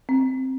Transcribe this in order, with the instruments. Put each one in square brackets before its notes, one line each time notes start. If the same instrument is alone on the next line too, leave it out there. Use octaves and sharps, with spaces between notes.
[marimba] C4